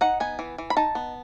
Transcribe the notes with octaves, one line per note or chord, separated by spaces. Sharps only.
D#4 F#5
B3 G#5
E3
E3
B5
D#4 A5
B3